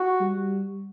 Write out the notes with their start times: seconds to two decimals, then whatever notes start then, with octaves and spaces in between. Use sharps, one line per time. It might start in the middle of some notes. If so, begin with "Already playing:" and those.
Already playing: F#4
0.20 G3